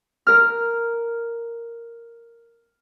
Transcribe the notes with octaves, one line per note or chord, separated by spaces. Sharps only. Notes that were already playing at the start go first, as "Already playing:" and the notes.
A#4 F6